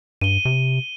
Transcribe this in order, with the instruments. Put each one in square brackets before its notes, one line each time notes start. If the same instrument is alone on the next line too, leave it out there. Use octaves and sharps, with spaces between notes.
[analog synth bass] G2 [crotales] D#7 G7
[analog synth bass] C3